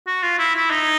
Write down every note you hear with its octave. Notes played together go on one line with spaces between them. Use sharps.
F#4
F4
E4
E4
D#4